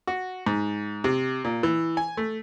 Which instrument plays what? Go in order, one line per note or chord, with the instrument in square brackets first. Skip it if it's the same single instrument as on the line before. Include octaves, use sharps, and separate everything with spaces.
[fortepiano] F#4
G#2
C3
A#2
E3
G#5
A3